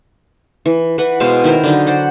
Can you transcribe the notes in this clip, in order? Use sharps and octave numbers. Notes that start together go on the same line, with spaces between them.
E3
E3 B4 F#5
B2 G#3 C5 F5
D#3 E4 A#4 C5
D3 F#3 D#4
C5 D5 F#5